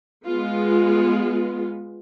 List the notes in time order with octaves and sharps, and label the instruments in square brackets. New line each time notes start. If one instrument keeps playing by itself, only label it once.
[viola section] G#3 B3 F4